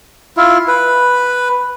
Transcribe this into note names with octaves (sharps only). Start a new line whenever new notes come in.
E4 F4
B4